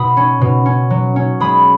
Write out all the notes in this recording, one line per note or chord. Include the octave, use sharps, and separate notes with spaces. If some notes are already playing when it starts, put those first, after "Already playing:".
Already playing: B2 B5 D#6
C#4
B2
C#4
F#3
C#4
G#3 B5 D#6